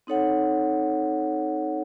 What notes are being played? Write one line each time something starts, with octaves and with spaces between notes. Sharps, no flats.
C4 D#4 A4 C#5 F#5